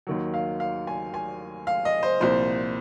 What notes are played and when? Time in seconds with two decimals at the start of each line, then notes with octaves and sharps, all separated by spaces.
0.07 D#2 D#3 F#3
0.34 F5
0.60 F5
0.87 G#5
1.14 G#5
1.67 F5
1.85 D#5
2.03 C5
2.20 C2 A#2 F3 C5